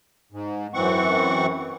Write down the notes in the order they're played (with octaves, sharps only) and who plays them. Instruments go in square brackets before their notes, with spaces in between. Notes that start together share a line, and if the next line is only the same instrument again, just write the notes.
[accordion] G#2
F#2 E3 C4 F#5 C#6